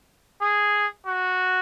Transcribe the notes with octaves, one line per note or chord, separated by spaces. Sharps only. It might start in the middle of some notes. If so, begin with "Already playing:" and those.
G#4
F#4